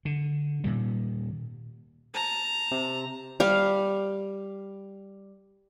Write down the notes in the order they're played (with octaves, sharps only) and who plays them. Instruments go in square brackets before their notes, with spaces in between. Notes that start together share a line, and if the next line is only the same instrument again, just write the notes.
[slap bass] D3
A#2 D#3 G3
[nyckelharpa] A5 A#5
[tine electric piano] C3
[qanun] G3 F5